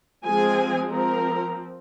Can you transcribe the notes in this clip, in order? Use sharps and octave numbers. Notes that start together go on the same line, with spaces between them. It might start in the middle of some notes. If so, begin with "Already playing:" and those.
F3 G#3 C4 G#4 G#5
F3 C4 A#4 A#5